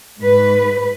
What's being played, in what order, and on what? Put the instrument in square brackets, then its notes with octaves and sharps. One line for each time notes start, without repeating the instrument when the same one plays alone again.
[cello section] G#2 B4